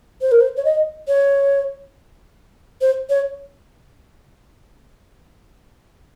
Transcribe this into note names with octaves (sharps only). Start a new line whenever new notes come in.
C5
A#4
C5
C#5
D#5
C#5
C5
C#5